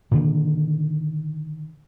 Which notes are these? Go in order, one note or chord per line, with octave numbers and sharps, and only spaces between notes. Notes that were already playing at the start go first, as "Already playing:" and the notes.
A#2 D3 D#3